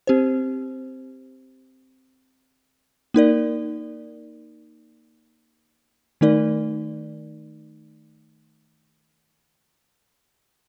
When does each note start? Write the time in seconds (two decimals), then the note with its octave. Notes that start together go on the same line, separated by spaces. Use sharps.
0.07 C4 G4 C5
3.14 A#3 D#4 A#4 D5
6.21 D#3 A3 D#4 A#4 D5